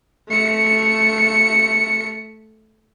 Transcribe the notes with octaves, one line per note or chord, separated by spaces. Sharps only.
A3 C#7